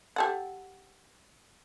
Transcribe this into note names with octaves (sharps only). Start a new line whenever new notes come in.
G4 A4 F#5